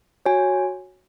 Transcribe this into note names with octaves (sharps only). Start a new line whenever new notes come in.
F#4 C#5 G#5